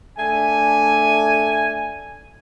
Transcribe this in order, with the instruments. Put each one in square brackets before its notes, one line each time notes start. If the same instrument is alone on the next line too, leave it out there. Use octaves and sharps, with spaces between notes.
[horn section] A3 D4 G#5